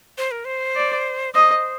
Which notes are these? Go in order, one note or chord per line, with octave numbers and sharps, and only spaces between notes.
C5
A#4
C5
D5
C5 D#5